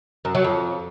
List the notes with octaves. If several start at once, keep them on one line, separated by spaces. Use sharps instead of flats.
F#2
F#3
F2